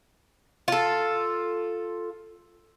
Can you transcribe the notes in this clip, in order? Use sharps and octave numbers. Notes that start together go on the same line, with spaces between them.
F4 A4